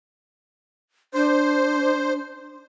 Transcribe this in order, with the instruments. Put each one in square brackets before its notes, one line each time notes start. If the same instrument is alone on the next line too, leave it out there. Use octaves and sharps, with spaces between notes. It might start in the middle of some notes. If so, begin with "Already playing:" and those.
[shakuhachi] D4 [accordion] C5